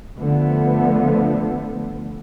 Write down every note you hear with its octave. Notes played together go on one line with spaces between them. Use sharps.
D3 F3 A3 B3